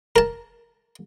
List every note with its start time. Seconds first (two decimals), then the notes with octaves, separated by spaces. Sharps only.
0.16 A#4 A5